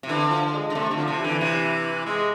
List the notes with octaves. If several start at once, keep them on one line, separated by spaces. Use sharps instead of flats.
C3
D3 E3
F3
G#3
D3
C3 A3
D3
F3
C3
E3
D3
C3
G#3